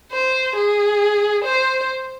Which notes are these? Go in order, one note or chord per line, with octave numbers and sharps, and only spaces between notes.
C5
G#4
C5